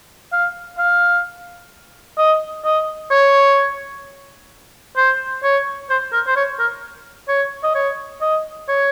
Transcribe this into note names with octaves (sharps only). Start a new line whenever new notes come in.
F5
F5
D#5
D#5
C#5
C5
C#5
C5
A#4
C5
C#5
A#4
C#5
D#5
C#5
D#5
C#5